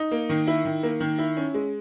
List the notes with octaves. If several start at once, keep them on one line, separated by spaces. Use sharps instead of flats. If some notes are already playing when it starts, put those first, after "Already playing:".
Already playing: D#4
A#3
D#3
E4
D#3
A#3
D#3
E4
C#4
G#3